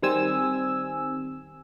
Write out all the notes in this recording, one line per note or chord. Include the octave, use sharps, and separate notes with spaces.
D#3 G3 C4 G#5 E6